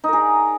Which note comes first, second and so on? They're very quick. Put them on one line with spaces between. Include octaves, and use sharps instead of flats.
D#4 A#4 G#4 D5